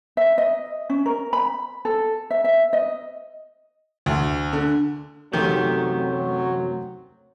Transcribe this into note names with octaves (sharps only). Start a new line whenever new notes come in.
E5
D#5
C#4
A#4
B5
A4
E5
E5
D#5
D2
D3
F#2 C3 D#3 F#3 A3 G4